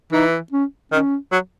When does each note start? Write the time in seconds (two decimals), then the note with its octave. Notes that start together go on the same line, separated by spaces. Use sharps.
0.12 E3 D#4
0.52 C#4
0.92 D#3 C#4
1.32 F#3